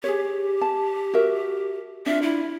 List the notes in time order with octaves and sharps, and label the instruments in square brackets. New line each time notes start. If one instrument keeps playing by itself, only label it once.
[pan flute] G4 [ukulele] G#4 C#5
[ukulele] A5
F#4 A#4 E5
[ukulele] D4 F4 [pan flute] E5
[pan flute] E4